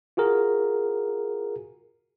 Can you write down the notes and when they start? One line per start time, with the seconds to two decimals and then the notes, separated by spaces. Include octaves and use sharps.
0.17 F4 F#4 G#4 A#4